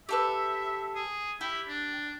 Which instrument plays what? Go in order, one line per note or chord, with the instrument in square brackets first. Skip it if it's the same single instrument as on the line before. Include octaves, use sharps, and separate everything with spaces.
[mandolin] G4 A4 B4 [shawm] E5
[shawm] G#4
[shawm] E4 [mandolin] G4
[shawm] D4